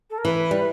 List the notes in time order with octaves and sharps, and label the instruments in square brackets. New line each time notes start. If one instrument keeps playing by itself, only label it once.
[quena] A4
A#4
[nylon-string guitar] E3 [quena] B4
[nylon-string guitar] G3